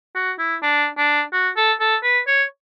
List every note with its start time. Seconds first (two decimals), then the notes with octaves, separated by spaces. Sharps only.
0.15 F#4
0.39 E4
0.62 D4
0.98 D4
1.33 F#4
1.56 A4
1.80 A4
2.03 B4
2.27 C#5